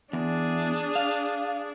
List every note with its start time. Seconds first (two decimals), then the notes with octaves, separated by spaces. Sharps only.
0.13 E2 D4 G#4
0.96 F5